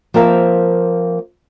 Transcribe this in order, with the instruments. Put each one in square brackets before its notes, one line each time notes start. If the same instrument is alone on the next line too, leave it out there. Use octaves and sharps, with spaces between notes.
[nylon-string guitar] F3 A#3 C4 A#4 E5 F5